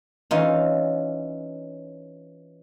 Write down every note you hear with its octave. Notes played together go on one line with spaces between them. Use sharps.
E3 C#4 D#4 F4